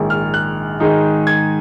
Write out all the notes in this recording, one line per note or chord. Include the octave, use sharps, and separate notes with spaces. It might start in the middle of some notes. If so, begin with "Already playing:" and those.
Already playing: A#1 G#2 D#3
F6
F#6
G#2 D#3 G#3 D#4
G#6